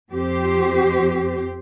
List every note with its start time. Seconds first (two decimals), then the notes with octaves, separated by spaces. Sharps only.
0.12 F2 C4 G4 C5